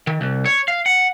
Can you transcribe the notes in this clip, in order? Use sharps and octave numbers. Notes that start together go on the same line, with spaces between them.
D#3
C2
C#5
F5
F#5